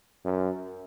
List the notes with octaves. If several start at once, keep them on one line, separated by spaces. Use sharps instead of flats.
F#2